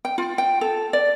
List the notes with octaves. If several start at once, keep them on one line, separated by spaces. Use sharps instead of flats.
G5
F4
G5
A4
D5